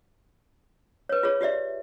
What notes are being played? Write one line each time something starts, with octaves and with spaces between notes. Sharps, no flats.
B4 C#5
F4 G#4 C#5
F4 G4 D5 E5